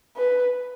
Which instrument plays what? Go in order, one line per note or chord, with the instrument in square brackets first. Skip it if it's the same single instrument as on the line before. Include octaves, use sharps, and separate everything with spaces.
[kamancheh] B4